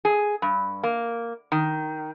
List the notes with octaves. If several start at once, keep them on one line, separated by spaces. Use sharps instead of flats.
G#4
G2
A#3
D#3